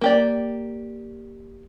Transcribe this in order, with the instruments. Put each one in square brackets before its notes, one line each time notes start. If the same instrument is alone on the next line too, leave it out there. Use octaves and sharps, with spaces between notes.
[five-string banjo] A#3 G4 D5